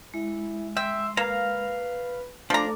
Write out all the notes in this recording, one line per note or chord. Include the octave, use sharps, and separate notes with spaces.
G#3 E4
E5 G5 C6
A#3 B4 F5 A#5
F3 A3 D4 A4 A#5 D6